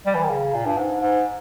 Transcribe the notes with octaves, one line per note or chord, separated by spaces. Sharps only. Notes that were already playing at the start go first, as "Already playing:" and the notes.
G3
E3
D#3
C#3
A#2
G2
G#2
G#2